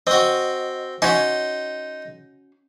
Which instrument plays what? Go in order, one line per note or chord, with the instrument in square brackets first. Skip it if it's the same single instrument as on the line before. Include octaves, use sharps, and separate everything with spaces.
[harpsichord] C4 F#4 [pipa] D#5
[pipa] C#4 F#4 [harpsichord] D#4 C6